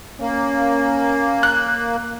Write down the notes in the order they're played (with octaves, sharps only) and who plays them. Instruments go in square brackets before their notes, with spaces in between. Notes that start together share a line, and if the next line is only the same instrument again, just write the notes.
[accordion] A#3 [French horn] C#4
[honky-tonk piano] F#6